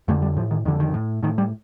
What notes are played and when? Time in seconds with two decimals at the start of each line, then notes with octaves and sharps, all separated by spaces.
0.08 F2 D3 A3
0.22 G3
0.37 A2 F3
0.51 D#3
0.65 F2 D#3
0.68 D3
0.80 D#3
0.94 A2
1.23 A2 D#3
1.38 G3